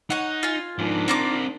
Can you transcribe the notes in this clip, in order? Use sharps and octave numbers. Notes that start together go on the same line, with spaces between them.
D#4 C#5 F#5
F4 G#5
G#2 D#3 F3 D4
A#3 C4 F4 A#4 D6